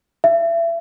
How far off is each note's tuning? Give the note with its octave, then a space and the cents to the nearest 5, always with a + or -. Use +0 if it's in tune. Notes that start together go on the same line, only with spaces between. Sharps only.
E5 +30